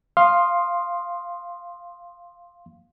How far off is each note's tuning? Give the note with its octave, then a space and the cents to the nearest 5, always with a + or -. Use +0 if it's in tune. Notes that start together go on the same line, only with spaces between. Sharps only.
F5 +0 C6 +10 D#6 -10